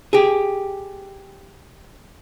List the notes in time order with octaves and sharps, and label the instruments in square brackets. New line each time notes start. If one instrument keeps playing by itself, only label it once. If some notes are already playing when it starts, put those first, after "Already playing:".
[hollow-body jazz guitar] G4 G#4